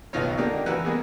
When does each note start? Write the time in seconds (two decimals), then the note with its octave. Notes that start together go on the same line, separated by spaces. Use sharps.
0.13 B1 B2 D#3 D#4 F4 C#5
0.37 D3 G#3 A#3 D4 D#4 G4
0.66 E3 F#4 A#4 F#6
0.85 G3 G#3 A#3 B3 G#4